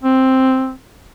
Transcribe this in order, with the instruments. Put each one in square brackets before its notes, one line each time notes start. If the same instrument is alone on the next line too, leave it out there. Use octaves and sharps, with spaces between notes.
[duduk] C4